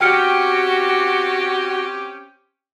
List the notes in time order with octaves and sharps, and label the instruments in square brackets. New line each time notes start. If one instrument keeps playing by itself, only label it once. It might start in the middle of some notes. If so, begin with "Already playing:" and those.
[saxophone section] C4 C#4 G4 [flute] F#4 [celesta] G5 F6 C#7